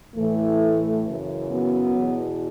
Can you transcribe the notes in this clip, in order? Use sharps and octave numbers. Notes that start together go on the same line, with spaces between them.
A2 E3 A3
F#2 C#3 E3
F#3 B3
E2 B2